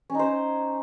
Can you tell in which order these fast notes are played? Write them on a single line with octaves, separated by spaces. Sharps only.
C#4 D#4 C5